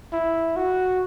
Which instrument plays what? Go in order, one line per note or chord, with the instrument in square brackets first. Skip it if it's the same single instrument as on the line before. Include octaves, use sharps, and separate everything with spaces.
[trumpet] E4
F#4